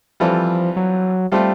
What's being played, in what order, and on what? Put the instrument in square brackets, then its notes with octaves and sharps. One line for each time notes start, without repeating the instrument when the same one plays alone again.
[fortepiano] E3 G3 C4 F4 A4 [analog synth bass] F3
[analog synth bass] F#3
[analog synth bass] G3 [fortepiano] A3 C4 F4 A4